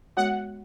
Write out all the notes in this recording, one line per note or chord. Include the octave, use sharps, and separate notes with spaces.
G#3 B3 F#4 C#5 F#5